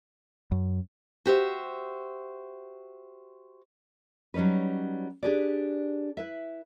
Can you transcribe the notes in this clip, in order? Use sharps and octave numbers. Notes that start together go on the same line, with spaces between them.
F#2
F#4 G4 C5 E5
F#3 G3 C#4 D#4 B4
D4 G4 G#4 B4 D5
E4 B4 E5